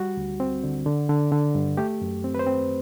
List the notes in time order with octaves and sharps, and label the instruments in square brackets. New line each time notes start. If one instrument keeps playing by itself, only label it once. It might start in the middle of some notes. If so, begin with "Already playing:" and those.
Already playing: [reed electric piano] G3 F#4
D2
C4
D3
D3
D3
D3
G2
A3 G4
F#2
C4
B4
C5
C4